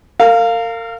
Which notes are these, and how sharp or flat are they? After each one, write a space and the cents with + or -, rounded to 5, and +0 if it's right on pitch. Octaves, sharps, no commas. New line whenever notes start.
A#4 -35 F5 +0